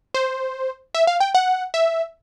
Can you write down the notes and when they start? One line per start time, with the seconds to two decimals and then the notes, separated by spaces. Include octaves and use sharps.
0.14 C5
0.95 E5
1.07 F5
1.20 G5
1.35 F#5
1.74 E5